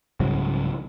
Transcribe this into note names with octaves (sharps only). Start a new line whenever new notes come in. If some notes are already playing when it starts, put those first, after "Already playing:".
C2 G#2 C#3 F#3